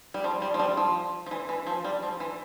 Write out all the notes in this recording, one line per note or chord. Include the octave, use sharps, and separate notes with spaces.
G3
F3
G3
F3
G3
F3
F3
E3
E3
F3
G3
F3
E3